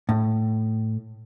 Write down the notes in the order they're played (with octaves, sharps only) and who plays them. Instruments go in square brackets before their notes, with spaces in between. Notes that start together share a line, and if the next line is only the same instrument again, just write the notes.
[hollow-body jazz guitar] A2